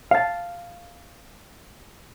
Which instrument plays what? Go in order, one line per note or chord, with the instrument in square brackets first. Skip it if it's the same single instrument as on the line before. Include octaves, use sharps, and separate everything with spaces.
[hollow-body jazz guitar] F5 A5